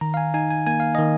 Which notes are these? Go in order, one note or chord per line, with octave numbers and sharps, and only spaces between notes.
D#3 A#5
F5
G#5
D#4 G#5
G#5
A#3 G#5
F5
D#3 D#5